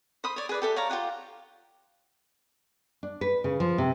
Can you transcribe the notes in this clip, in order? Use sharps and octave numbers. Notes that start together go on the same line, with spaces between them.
C5 B5 D#6
C#5 D5
G#4 B4 D5
G4 A4 E5
C#5 D5 F5 A#5
F4 G4 G#4 F#5
D4
B4
C#3
F3
C3